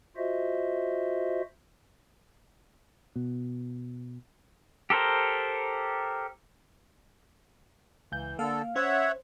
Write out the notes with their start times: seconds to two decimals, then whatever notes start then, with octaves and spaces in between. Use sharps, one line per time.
0.17 F4 F#4 C5 D#5 E5
3.16 B2
4.90 G4 A4 A#4 C5
8.12 C#2 E3 G6
8.39 D3 A#3 A4 F5
8.76 C#4 C5 C#5 E5 F#5